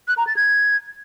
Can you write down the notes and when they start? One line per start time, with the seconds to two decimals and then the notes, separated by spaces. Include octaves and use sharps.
0.08 F#6
0.17 A#5
0.27 A6
0.36 G#6